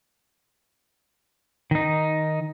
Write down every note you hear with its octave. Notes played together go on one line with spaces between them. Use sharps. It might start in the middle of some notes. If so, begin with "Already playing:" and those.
D#3 D#4